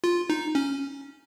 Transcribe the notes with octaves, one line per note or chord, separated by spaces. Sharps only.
F4
D#4
C#4